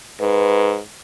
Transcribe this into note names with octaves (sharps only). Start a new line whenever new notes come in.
G#2 B4